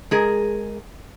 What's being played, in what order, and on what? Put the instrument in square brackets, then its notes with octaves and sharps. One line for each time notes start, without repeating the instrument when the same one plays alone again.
[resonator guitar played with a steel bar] G#3 G#4 A#4